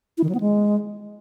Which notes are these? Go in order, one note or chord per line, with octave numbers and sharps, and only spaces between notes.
E4
D#3
F#3
B3
G#3